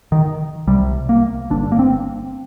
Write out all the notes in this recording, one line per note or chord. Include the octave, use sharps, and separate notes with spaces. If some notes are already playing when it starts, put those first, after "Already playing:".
D#3
C2 C3 G3
A#3
G1 G2 D3 D4
A#3
C4